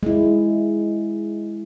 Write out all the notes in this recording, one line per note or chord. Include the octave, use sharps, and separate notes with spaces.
G#3 E4